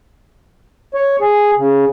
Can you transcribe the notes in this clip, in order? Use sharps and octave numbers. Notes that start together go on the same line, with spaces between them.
C#5
G#4
C#3